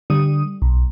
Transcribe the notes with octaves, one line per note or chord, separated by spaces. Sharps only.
D3 G3 D#6
B1